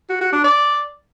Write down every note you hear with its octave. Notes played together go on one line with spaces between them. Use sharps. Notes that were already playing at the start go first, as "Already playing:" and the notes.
F#4
F#4
D4
D5